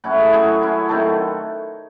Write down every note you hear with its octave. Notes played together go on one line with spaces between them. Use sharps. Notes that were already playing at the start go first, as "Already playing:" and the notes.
A2 F#3 C#4 E4 F#4 F#5
G#4 G#5
F#3 A3 C#4 E4 G#4 G#5
F#3 C#4 E4
D#3 F#3 A3 C4 A4 A5